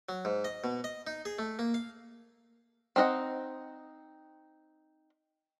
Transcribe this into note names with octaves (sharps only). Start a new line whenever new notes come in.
F#3
G#2
D#5
B2
D#5
D#4
G#4
A3
A#3
F5
C4 D#4 A#4 D#5 F#5